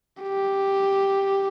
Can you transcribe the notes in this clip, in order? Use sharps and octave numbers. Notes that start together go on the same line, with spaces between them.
G4